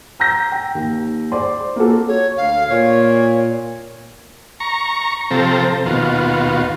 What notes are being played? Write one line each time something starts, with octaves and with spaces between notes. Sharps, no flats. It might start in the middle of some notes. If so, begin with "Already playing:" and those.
A#5 E6 G6 A#6
G5
D#2
C5 D5 C6
A#3 F4 F#4 A4
C#5
D2 F5
A#2 C#5
A#5 C#6
C3 F3 C4 A4 A#5
D#2 B2 F4 F#4